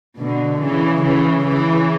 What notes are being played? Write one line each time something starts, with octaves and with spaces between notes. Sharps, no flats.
B2 D3
C#3 E3
C#3 E3
C#3 E3